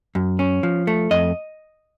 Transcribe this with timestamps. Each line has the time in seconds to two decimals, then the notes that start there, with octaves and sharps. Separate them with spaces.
0.15 F#2
0.39 C#4
0.63 F3
0.87 A3
1.11 F2 D#5